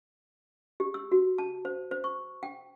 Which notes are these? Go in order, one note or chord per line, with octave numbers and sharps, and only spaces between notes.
G4
E6
F#4
A5
C5
C5
C#6
G5